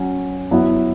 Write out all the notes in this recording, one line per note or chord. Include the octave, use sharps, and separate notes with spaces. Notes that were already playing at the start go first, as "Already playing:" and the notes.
Already playing: F#3 C#4 F#4
F#3 B3 E4